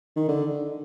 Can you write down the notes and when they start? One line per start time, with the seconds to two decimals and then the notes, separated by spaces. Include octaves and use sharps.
0.16 D#3
0.28 D3